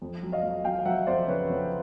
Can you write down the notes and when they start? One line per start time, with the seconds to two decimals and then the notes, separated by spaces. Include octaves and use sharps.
0.02 F2
0.23 F#3
0.32 D#5 F5
0.43 F#3
0.64 F#3 F5 G5
0.79 F5
0.85 F#3 E5 F#5
1.07 F2 C5 D5
1.27 C#3 B4 C#5
1.50 F2